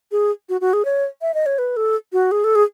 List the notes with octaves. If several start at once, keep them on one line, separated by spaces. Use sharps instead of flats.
G#4
F#4
F#4
G#4
C#5
E5
D#5
C#5
B4
A4
F#4
G#4
A4
G#4